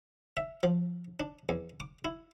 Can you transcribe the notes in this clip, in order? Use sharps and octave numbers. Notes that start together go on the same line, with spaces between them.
E5
F3
D4
E2
D6
E4